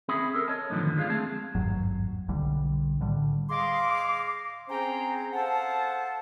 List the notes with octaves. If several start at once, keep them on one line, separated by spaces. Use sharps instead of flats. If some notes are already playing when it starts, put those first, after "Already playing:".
C4 C#4 G#4 E5 B5
A4 A#4
C#5 D#5 A5
F#2 A2 D3 D#3 F3 B3
G#3 A3 D4 F4 G#4 F5
A3 C4 G#4 A5
G#1 E2 G2 F#3
B1 D3 G3
A2 D3 G3
G#4 D#5 F5 C6 D6
C4 C#4 G#4 C5 G5 A#5
A4 C5 F5 F#5 A5